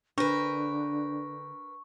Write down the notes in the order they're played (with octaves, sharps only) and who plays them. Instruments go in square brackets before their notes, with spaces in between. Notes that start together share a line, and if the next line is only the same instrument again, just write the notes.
[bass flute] D3 [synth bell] D4 [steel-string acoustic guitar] A#4 B4 [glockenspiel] C#6